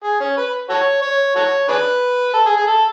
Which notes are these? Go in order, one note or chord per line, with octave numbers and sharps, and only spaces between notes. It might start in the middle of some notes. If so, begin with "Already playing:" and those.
G#4
C#4
B4
F#4 A4 C#5
C#5
F#4 A4 C#5
D4 G#4 B4
A4
G#4
G#4
A4